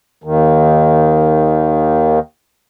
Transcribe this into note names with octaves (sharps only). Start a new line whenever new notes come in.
D#2 D#3